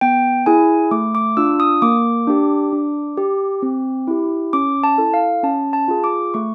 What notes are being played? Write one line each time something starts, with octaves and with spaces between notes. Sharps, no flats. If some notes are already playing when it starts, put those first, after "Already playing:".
B3 G5
E4 G#4 G#5
A3 D6
D6
D4 F4 E6
D#6
A#3 D6
D4 G4
D4
G4
C4
E4 G4
C#4 D6
A5
E4 A4
F5
C#4 A5
A5
F4 G#4
D6
A3 C#6